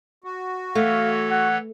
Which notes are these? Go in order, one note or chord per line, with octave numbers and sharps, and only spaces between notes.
F#4
E3 A3 A4 C#5 F5
F#5